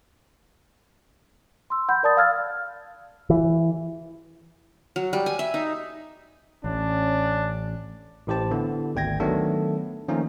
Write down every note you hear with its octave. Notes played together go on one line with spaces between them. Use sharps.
C6 E6
F#5 B5 G6
A#4 D5 A5 D#6 A6
F5 E6 F6 G#6 A6
E3
F#3
G3
G#5
E5
D#4
A1 C#4 D4
A1 A2 G4 C5 A5
D3 B3 E4
G#1 D2 G5 G#6 A#6
D#3 F#3 A3 B3 D4 A4
D#3 F3 A3 A#3 C#4 D#4